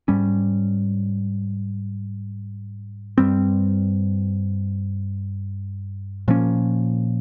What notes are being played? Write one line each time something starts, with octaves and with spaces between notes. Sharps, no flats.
G#2 G3 C#4
G2 G3 C4
A#2 F3 A#3 C#4